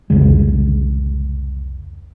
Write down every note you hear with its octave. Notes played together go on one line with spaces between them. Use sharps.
C2 F2 C#3 G#3